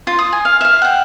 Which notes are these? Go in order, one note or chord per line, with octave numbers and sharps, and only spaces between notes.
F4
D#6
G#5
F5
E5 F5
F#5 G5